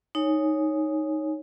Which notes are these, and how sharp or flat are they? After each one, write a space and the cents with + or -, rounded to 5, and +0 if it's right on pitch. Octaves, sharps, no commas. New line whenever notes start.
D#4 +0 C#5 +0 G#5 +0